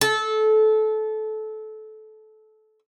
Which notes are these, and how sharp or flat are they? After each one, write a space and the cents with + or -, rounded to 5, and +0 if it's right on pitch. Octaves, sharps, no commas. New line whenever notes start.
A4 -20